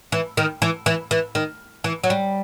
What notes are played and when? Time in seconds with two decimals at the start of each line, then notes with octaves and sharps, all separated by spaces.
0.12 E3
0.37 D#3
0.62 E3
0.86 E3
1.11 E3
1.35 D#3
1.84 E3
2.03 F#3
2.10 G3